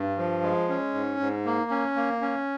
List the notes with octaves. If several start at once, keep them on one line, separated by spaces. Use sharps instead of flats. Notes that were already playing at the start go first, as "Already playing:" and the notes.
Already playing: G2
F3
G#3
C#4
G#2
G#2
A#3
C#4
A#3
C#4